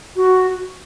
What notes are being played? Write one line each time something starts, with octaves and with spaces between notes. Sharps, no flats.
F#4